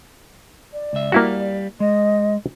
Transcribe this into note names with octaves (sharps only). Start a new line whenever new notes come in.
D5
C#2 E5
G3 A#3 E4 F#4 F5
G#3 D#5